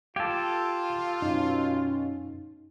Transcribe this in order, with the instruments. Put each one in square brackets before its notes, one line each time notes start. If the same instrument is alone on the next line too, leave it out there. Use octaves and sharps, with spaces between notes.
[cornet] F4 [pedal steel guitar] G4 A4 [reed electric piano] F5 G5 G#6
[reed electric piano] F#2 D#4 [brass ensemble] B2 C#4